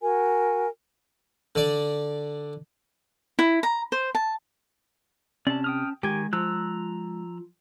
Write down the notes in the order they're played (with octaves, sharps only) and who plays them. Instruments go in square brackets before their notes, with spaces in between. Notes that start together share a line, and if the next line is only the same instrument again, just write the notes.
[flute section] F#4 A#4 G#5
[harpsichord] D3 D5
[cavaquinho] E4
A#5
C5
A5
[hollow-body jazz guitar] C3 [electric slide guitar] C#4 A5 [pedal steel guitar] D5
[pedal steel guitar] G5 D#6 F6
[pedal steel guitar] D#3 G#5 [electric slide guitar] G#3 [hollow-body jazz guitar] G4
[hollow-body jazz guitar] F3 [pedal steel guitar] A#5 E6 F#6